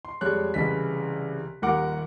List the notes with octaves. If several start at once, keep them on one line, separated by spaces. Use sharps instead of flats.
C6
F2 G3 G#3 C#5 F#6
C2 C#3 E3 D#5 B6
D#1 D#2 A#4 F#5 D6